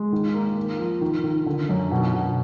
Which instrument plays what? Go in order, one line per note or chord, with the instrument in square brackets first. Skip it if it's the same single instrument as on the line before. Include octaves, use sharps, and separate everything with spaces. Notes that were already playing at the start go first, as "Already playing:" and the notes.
Already playing: [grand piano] G#3
D#3
A#3
A#3
F3
D#3
D#3
D3
F#2
B2
B2